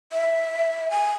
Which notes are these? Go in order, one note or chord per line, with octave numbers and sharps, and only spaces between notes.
E5
G#5